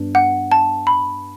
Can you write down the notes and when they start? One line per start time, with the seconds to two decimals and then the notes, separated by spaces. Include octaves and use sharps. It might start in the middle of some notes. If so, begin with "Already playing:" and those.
Already playing: G2 B3 D4
0.15 F#5
0.52 A5
0.87 B5